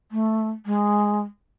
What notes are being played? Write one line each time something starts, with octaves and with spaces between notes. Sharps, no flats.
A3
G#3